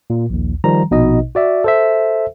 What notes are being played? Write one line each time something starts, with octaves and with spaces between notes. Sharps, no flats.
A#2
A#1 D#2
D#3 F3 G3 A#5
A#1 B2 D#4 D#5
F#4 D5 E5
A4 C5 E5